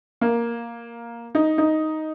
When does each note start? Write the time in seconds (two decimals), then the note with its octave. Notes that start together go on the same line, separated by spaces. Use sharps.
0.21 A#3
1.35 D#4
1.58 D#4